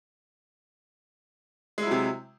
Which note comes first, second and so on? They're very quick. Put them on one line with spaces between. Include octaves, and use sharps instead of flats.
G#3 E4 F#3 C3